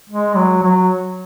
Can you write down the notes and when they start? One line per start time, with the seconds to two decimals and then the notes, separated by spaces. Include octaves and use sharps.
0.10 G#3
0.36 F#3
0.63 F#3